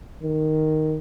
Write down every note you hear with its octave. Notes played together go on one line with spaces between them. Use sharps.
D#3